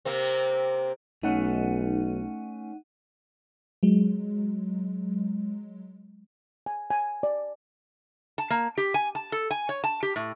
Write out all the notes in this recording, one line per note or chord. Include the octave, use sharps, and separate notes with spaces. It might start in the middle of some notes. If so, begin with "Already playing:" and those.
C3 A#3 C4
B1 A3 C#4 D#4 F#5
F#3 G#3
G#5
G#5
D5
A5
A#3
G4
G#5
A5
A4
G#5
C#5
A5
G4
A2